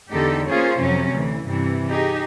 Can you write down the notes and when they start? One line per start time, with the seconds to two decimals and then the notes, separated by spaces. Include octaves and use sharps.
0.11 E2 D3 D#4 G4 A4 D5
0.47 A#3 C#4 F4 G#4 C5 C#5
0.79 F2 C3 F#3 C#4
1.13 D2 E3
1.44 G2 C3 E3
1.89 D#4 G4 G#4